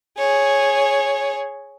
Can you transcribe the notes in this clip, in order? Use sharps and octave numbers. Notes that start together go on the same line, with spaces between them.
G#4 C#5